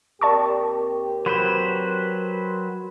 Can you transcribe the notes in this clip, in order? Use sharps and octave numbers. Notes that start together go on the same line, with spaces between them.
D#2 C4 G4 A#4 D5 G5 A5 C#6
F#3 B4 C5 B5